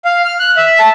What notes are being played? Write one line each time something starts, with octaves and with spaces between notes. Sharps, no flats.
F5
F6
F#6
E5
A5